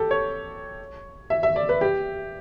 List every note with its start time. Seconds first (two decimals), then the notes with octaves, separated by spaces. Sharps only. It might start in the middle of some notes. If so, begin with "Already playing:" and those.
Already playing: G4 A4
0.11 C#5
1.30 E5
1.43 E5
1.56 D5
1.69 B4
1.81 G4